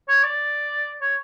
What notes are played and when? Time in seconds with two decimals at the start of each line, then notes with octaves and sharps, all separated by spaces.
0.08 C#5
0.24 D5
1.01 C#5